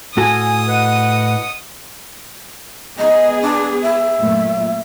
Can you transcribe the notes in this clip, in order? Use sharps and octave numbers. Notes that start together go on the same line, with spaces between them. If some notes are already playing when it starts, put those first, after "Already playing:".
A2 F#4 A4 G#5 D#6
B4 D#5 F#5
B3 G#4 D#5
D4
E5
F#2 A#2 A3